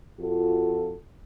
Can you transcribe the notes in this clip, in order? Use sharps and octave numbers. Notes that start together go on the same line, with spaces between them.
F2 F4 F#4 A4